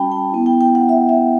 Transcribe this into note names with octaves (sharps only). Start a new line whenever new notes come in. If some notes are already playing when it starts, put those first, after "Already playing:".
Already playing: G3 C#4 F#4 G5 A5 B5
G5
B3 E4
G5
G5
F#5
E5
E5